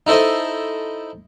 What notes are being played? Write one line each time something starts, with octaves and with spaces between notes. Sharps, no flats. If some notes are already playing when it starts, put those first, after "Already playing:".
D#4 E4 A4 C5 D#5